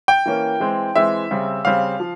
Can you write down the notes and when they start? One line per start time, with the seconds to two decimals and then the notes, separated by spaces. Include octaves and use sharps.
0.08 G5
0.26 E3 A#3 C#4
0.60 E3 G#3 C4
0.95 E3 G#3 C4 E5
1.31 C#3 G3 C4
1.65 C#3 G3 C4 F5
2.00 F3